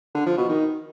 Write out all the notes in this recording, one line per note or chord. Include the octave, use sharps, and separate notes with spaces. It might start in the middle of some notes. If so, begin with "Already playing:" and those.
D3
F3
B2
D#3